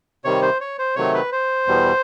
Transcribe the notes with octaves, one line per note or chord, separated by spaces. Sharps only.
C3 D#3 G3 C#5
C5
C#5
C5
C3 D#3 F#3 A3 C#5
B4
C5
E2 B2 G3